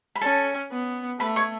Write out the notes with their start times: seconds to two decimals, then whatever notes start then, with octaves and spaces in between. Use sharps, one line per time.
0.15 B5
0.21 C#4 A4 A5
0.71 B3
1.20 A3 B4 B5
1.36 C#5 C#6